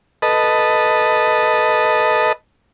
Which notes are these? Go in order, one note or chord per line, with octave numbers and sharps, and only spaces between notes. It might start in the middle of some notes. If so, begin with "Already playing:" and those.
A4 B4 D#5